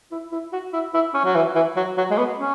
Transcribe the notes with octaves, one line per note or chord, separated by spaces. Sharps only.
E4
E4
F#4
E4
E4
C#4
F#3
E3
E3
F#3
F#3
G#3
B3
C#4